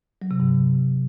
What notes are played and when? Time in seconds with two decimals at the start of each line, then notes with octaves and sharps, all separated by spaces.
0.22 F#3
0.31 C3
0.40 G2